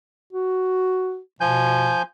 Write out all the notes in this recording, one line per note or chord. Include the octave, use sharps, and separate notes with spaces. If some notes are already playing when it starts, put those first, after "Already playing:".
F#4
B2 F3 G#5 G6